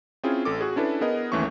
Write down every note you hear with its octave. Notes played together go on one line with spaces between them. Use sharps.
C4 C#4 E4 F4 G#4
A1 A4 D6
F#4 G#4
C#4 D4 E4 A4 B4
B3 G#4 A#4 B4 D#5
G1 D#2 E3 A3 C#4 C#6